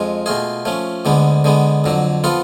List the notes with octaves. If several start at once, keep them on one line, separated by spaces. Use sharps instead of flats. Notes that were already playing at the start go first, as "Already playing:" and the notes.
Already playing: F2 F3 G#3
B2 A3 F4 G#4
F3 A3 C#4
D2 D3 G#3 B3
D3 G#3 B3
F2 D3 F#3
F3 B3 F4 A4